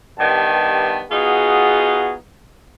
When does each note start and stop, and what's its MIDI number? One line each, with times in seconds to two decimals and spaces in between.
0.18 1.02 43
0.18 1.02 51
0.18 1.02 59
0.18 1.02 67
0.18 1.02 81
1.10 2.15 59
1.10 2.15 63
1.10 2.15 65
1.10 2.15 66
1.10 2.15 68